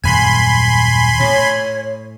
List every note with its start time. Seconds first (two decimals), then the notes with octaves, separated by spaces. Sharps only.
0.04 D#1 F#2 G#5 B5 C6
1.20 A2 C#5